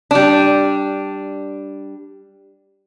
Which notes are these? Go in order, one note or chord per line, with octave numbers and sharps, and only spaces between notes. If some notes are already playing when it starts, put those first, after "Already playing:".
G3 D4